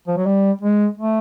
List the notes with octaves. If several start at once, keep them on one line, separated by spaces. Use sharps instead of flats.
F3
F#3
G3
G#3
A3